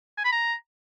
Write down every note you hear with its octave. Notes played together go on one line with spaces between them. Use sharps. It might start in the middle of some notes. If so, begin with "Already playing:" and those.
G#5
B5
A#5